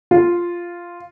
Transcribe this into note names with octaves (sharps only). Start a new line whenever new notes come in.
F4